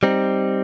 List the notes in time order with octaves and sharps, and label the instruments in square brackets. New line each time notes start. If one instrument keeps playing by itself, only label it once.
[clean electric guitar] G3 C4 D#4